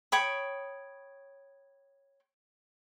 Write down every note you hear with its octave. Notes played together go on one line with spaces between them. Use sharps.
C#5 G5 B5 D#6